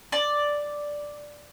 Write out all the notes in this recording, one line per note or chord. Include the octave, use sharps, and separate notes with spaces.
D5